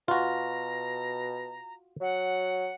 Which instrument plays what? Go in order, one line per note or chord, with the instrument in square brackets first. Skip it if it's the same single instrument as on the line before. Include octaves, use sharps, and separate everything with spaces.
[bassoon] B2 [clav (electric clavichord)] F4 F#4 [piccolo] A#5
[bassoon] F#3 [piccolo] F#5